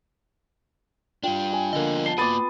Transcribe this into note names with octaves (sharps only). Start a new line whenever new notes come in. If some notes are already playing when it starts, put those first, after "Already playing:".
G3 D4 F4 G5
G#5
D3 F3 A#3 B3 D#5
A5 C7 G7
A#3 B3 F#4 D6 A6 D#7